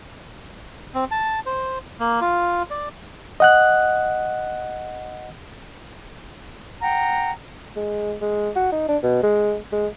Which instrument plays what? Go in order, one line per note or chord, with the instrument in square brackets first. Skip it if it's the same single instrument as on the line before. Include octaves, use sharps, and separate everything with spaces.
[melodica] C4
A5
C5
A#3
F4
D5
[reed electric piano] D#5 F#5 F#6
[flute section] F#5 G5 A#5
[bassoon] G#3
G#3
F#4
D#4
D4
B2
G#3
G#3